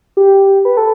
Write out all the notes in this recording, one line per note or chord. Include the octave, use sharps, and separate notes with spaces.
G4
B4
A4